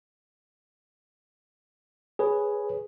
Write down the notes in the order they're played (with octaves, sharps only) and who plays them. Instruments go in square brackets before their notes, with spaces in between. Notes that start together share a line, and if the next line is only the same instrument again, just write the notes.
[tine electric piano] G#4 B4 C#5